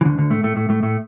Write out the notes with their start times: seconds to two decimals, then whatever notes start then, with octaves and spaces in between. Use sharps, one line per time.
0.01 E3
0.05 D2 D3
0.18 D2 D3
0.30 A2 A3
0.43 A2 A3
0.56 A2 A3
0.69 A2 A3
0.83 A2 A3